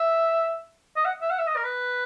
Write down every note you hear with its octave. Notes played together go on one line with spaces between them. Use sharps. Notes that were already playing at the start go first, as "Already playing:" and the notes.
Already playing: E5
D#5
F#5
E5
F#5
E5
D#5
A#4
B4